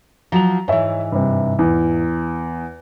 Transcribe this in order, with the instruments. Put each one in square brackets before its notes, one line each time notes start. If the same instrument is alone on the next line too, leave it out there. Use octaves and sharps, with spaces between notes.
[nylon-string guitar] F3 F#3 [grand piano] A#5 F7
[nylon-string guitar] G#2 E3 [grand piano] C#5 E5
[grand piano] G2 C3
E2